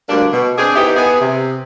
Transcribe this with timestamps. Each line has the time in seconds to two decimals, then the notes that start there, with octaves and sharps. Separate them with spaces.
0.09 D2 G3 A#3 D4
0.32 B2
0.58 C4 D4 G#4
0.76 B3 D#4 E4 G4
0.96 B3 G#4
1.20 C3